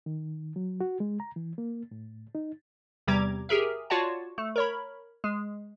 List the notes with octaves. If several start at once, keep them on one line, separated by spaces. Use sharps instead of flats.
D#3
F#3
F#4
G#3
A#5
E3
A#3
A2
D#4
E2 C3 G3 A#5 D6 G#6
G4 G#4 A#4 E5
F4 F#4 C#5 D5 F#5 A5
A3
A#4 C#5 B5
G#3